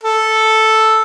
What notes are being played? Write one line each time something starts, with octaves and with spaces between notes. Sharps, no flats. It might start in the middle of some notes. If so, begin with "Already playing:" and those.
A4